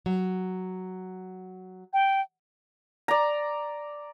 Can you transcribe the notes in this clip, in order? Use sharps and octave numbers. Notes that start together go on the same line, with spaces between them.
F#3
G5
D5 A#5